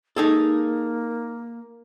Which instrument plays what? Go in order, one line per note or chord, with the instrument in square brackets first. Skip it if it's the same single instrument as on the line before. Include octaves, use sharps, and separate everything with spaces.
[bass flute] A#3 [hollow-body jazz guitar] D#4 G#4 A4